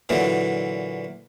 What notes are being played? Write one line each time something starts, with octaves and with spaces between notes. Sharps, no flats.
A#2 D3 E3 F#3